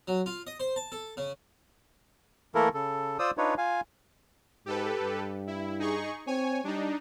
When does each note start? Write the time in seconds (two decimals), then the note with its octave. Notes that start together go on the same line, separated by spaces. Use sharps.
0.08 F#3
0.26 F4
0.47 D#5
0.60 C5
0.76 A5
0.92 A4
1.17 C#3
2.55 E3 A3 A#3 E4 A4 A#4
2.74 C#3 A4
3.19 F4 C5 D5 D#6 E6
3.38 D4 D#4 F4 B4 C#5
3.58 F4 F5 G#5
4.66 G#2 G4 A4 B4
5.02 G2
5.47 E4
5.80 D#4 G#4 C#6
6.27 C4 C#5 G#5
6.64 G3 D4 D#4